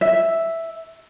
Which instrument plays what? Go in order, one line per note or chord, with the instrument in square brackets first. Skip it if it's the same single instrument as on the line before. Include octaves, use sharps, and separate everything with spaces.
[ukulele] E5